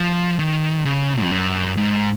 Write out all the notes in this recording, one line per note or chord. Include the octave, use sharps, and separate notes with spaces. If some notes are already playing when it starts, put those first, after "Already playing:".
Already playing: F3
D#3
C#3
F2
F#2
G#2